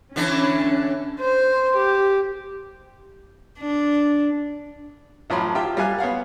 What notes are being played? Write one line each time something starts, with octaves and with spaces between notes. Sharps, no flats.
D3 E3 C#4 D4
C5
G4
D4
A1 F3 F#3 B5 C6
F4 G4 E5 G5
G3 F5 G#5 F#6
B3 C#5 F5 F#5